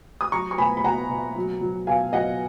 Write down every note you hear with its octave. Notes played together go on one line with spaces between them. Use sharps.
D#6
F#3 A#5 C#6
C#6
B2 G#5 B5
B5
B2 F#5 A#5
B2
F#3
F#3
B2 F5 G#5
F#3 D#5 F#5